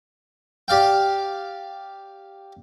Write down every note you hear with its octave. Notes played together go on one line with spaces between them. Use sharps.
G4 D5 F5 G5